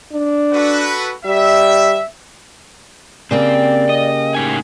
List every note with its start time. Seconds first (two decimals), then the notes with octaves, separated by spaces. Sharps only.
0.13 D4
0.53 F#4 A4 B4
1.25 G3 E5
3.31 C#3 A#3 C4 G4 D5
3.89 D#5
4.35 A2 D#4 G#5